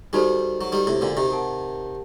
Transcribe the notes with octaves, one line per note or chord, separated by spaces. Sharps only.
D#3 G3 D#4 F#4 A4 C5
F#3
D#3 G3
A2 C3
A#2 D3
C3 D#3
G4 A#4 F#5 A5